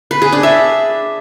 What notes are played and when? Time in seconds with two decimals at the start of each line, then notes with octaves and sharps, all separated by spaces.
0.11 B4
0.22 G#4
0.32 D4
0.43 E5